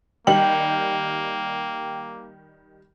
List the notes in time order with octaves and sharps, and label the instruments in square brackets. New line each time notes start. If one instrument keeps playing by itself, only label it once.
[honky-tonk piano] D#3 G3 F#7 [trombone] A#3 [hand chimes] G5